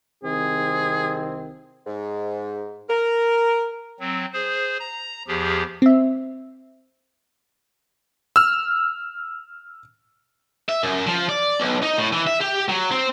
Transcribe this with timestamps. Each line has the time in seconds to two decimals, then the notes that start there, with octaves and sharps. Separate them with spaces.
0.24 C2 D#3 C4 G#4
1.86 G#2
2.88 A#4
4.00 F#3 C4
4.33 G#4 C5
4.79 A#5
5.28 E2 F3 G4 G#4
5.82 C4 E5
8.36 E6 F6
10.69 E5
10.83 F#2
11.07 F3
11.29 D5
11.60 B1
11.83 D#4
11.98 A2
12.12 E3
12.27 E5
12.40 G4
12.68 F#3
12.91 C4